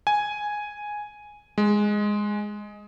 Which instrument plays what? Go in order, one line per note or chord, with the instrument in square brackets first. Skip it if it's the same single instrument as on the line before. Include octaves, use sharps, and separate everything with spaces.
[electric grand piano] G#5
G#3